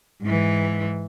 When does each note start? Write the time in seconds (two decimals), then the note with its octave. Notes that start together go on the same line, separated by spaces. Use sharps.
0.22 G#2 E3